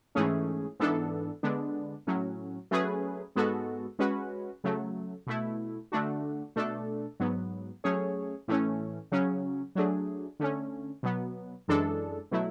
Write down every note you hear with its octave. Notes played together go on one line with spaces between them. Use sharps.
G#2 E3 A3 C#4 G#4
G#2 E3 B3 D4 A4
D3 G#3 B3 D4
A2 F#3 C#4
F#3 A3 C#4 G#4 B4
G#2 G#3 B3 F#4 A4
G#3 C#4 F#4 B4
C#3 F#3 A3
B2 A3 E4
D3 A3 D4 F#4
B2 A3 D4 A4
G#2 F#3 B3
F#3 A3 C#4 G#4 C#5
A2 E3 A3 C#4
C#3 F#3 C#4
F#3 A3 D4 G#4
D3 A3 C#4
B2 F#3 B3
F#2 E3 G#3 D4 A4
B2 F#3 A3 E4